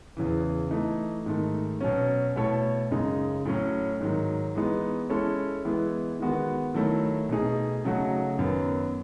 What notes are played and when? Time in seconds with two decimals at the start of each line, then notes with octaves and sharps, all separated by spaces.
0.17 E2 C#3 E3
0.71 E3 A3 D#4
1.26 G#2 D#3 A3
1.81 B2 F#3 C#4
2.36 B2 A3 E4 A4 C#5
2.91 F#2 C#3 G#3 D#4
3.45 A2 F#3 C#4
4.01 G#2 D#3 F#3
4.55 E3 G#3 B3 D#4
5.10 G#3 C#4 E4 A4 C#5
5.65 E3 G#3 B3 E4
6.20 D#3 G#3 B3 F#4
6.74 D#3 F#3 A3 E4
7.29 B2 A3 D#4 G#4
7.84 C#3 F#3 A3 D#4 F#4
8.39 F#2 D#3 F#3 B3